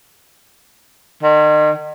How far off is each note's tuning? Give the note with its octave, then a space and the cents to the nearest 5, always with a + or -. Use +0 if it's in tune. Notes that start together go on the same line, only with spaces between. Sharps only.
D#3 -40